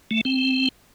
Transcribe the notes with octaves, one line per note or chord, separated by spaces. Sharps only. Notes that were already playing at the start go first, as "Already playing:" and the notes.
A3
C4